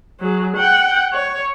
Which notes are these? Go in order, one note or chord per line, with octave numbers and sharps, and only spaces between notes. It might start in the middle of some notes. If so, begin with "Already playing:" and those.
F#3 G#4
F#5 G5
C#5